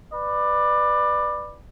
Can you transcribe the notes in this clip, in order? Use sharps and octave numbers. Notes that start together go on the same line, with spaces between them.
B4 D5